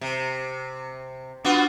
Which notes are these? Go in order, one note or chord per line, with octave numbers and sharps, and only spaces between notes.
C3
B3 D4 F4 F#4